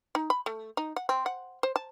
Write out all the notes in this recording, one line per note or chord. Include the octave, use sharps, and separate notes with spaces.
D#4
B5
A3
D#4
F#5
C4
F#5
C5
A5